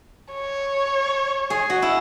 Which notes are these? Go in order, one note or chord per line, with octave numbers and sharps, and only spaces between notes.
C#5
G#4
F#4
E4